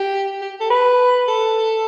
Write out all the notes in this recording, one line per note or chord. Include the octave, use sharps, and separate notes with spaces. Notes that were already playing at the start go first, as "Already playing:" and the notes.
Already playing: G4
G4
A4
B4
A4